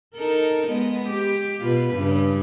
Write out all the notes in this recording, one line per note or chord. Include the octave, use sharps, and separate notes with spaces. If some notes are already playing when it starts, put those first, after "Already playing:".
D#4 A4 A#4
G#3 B3 D#5
G4
B2 F4 B4
G2 C#3